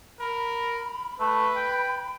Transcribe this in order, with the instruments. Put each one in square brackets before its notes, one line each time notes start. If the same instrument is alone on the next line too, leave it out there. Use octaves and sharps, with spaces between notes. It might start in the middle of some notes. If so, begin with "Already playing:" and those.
[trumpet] A#4 [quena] B5
[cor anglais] A3 [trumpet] B4 [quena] B5
[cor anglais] G5